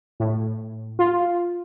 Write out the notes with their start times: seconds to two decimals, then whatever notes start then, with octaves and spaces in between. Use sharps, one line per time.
0.20 A2
0.99 F4